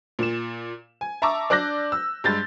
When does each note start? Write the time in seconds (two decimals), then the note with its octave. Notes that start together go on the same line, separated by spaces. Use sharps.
0.19 A#2 E7
1.01 G#5
1.22 E5 A5 A#5 C#6 D6 E6
1.50 D4 D5 D6 F#6 G6 A#6
1.92 E6
2.24 G2 G#3 G6 A6